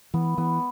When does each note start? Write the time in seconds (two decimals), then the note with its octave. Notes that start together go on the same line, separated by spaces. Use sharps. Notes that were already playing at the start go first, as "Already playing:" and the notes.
0.14 E3 B3
0.38 E3 B3